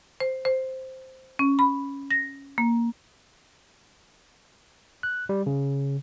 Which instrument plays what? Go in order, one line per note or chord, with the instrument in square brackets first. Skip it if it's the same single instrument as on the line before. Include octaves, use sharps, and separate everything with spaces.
[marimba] C5
C5
C#4
B5
A#6
A#3
[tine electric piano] F#6
G3
C#3